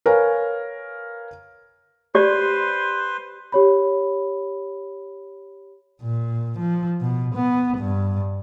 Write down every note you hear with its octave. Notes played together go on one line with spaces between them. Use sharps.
A#4 B4 C#5 F5 G#5
G4 B4 C5 D5 C6
G4 C#5 B5
A#2
F3
B2
B3
G2